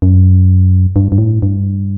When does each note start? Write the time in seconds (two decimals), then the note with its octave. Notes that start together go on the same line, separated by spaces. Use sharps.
0.02 F#2
0.96 G2
1.12 G2
1.18 A2
1.42 G2